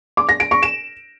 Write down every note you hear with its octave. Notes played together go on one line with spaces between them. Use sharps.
D6
A#6
D7
C#6
E7